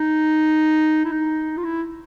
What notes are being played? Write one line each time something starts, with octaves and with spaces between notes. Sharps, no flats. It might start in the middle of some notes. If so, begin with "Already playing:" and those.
Already playing: D#4
E4
D#4
F4
E4